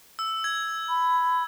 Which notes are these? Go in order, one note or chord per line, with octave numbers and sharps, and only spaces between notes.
E6
G#6
B5